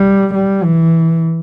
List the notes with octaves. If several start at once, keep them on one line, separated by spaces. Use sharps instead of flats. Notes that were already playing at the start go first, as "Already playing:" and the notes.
Already playing: G3
G3
E3